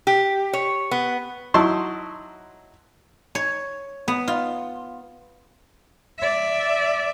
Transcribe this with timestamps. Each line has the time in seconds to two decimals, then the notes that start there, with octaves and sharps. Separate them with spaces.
0.07 G4
0.53 C#5
0.91 B3
1.54 F#3 D#4 E4 A5 C6 C#6
3.35 C#5
4.08 B3
4.28 F4
6.19 D5 E5